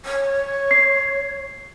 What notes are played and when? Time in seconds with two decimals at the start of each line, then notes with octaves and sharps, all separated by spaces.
0.05 C#5
0.71 C7